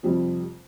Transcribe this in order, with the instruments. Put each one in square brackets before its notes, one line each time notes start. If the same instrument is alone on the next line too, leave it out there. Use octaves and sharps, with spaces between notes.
[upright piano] F2 C3 G3 C4